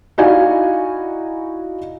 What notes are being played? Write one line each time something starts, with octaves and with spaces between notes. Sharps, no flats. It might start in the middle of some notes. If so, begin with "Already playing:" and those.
D#4 E4 F#4 D5 F5 G#5